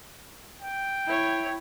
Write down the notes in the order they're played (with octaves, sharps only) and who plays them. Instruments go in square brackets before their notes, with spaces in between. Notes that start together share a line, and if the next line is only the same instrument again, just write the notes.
[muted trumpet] G5
[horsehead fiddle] E4 C#5